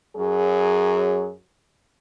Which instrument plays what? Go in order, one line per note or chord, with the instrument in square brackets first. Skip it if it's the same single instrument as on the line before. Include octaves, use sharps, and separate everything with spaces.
[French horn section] F#2 F#3 G#4